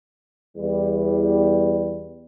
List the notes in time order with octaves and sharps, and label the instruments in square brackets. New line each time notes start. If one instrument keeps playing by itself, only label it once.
[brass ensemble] E2 G3